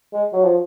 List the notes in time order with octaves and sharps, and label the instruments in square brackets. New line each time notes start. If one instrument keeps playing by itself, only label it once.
[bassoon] G#3
F#3
F3